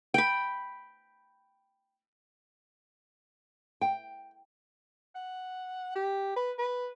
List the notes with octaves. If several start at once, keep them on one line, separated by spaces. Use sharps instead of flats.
G5 B5
G5
F#5
G4
B4
B4